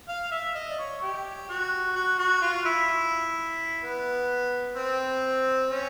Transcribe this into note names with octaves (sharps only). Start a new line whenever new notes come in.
F5
E5
D#5
D5
C#5
G4
F#4
F#4
F#4
F4
E4
B3
C4
C#4